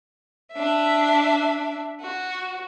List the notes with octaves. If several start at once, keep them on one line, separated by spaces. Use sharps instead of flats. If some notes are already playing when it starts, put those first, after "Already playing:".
D4 E5
F#4